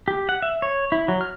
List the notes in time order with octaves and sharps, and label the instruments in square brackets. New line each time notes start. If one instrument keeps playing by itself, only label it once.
[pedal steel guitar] G4
F#5
E5
C#5
E4
F#3
F6